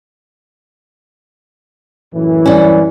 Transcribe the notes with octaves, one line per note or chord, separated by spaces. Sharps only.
F#2 A2 E3
G3 C#4